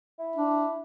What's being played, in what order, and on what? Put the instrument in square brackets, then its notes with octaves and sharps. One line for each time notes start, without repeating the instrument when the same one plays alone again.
[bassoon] E4
[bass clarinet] D4